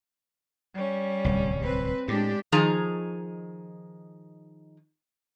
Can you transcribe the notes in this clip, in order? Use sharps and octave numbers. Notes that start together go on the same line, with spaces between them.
G3 C#4
D1 C2
C4 B4
A2 G#3 D4 G4
D#3 F3 D#4 G#4 A#5